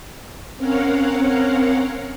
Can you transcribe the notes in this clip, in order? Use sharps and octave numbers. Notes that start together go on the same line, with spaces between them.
C4 C#4 A#4 C#5 F5 F#5